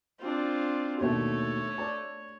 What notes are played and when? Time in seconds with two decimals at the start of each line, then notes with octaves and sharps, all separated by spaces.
0.21 C4 D4 F4
1.01 D#2 B2 A3 C#5 E5
1.78 D5 A5